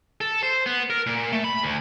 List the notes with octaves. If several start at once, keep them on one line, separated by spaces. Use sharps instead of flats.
A4
C5
B3
A#4
A#2
A3
B5
D2